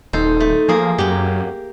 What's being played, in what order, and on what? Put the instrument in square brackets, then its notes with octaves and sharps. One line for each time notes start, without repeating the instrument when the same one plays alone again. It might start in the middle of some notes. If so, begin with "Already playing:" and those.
[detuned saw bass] D#1 [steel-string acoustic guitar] D#4 [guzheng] A4 C5
[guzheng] A3
[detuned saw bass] F3 [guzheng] A#3 G#4
[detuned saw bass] F#2 [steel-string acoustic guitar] F#3 A#3 [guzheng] G4